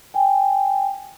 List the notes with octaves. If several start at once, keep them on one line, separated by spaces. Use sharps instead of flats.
G5 G#5